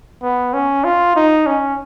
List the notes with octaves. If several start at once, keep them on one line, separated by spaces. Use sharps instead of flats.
B3
C#4
F4
D#4
C#4